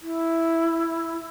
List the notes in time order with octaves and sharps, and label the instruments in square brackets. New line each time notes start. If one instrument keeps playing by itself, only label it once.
[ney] E4